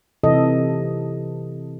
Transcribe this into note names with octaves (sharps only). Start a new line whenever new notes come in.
C3 E3 A4 D#5